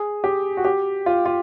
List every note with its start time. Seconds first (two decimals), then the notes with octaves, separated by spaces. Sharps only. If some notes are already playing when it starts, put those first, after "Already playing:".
Already playing: G#4
0.24 G4
0.57 F#4
0.65 G4
1.06 F4
1.26 F4